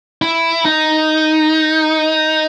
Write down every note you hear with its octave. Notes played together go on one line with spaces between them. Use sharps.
E4
D#4